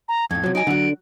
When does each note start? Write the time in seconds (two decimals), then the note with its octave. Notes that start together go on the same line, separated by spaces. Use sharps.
0.09 A#5
0.31 F2 A2 G#6
0.43 C3 F3 F#3
0.55 D#4 D#5 G#5 D7
0.67 D3 F#3 F#4